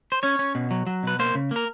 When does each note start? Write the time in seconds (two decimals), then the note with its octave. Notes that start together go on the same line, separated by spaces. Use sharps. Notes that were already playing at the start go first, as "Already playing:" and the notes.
0.12 C5
0.23 C#4 C#5
0.39 C#4
0.55 B2
0.71 F#3
0.87 F#3
1.03 B2 B4
1.19 A#3 C5
1.35 C#3
1.51 A#3 A#4